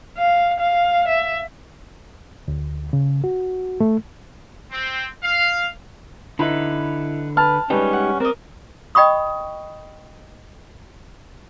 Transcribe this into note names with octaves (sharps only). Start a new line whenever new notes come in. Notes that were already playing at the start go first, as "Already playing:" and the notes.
F5
F5
E5
D2
C#3
F#4
A3
C4
F5
D3 D#4 E4 B4 B5
B4 A5 F6
G3 G#3 C#4 D#4 G4 B4
F#5
C4 A#4 D5 D#5
D#5 G5 B5 C#6 D#6